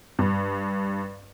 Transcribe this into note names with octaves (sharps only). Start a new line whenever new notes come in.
G2